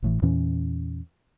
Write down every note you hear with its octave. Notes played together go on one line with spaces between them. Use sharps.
G#1 A2 E3
E2 A#2 E3 C#4